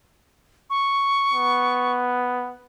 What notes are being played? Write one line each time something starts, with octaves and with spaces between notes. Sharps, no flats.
C#6
B3